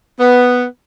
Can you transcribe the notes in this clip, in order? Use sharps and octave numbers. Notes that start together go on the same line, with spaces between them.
B3